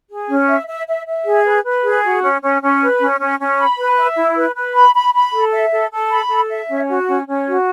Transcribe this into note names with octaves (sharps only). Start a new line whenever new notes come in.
G#4
C#4
E5
E5
E5
E5
G#4
B4
B4
G#4
F#4
C#4
C#4
C#4
B4
C#4
C#4
C#4
B5
B4
E5
E4
B4
B4
B5
B5
B5
A4
E5
A4
A4
B5
A4
E5
C#4
F#4
C#4
C#4
F#4